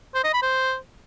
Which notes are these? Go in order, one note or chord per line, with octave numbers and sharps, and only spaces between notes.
C5
D#5
B5
C5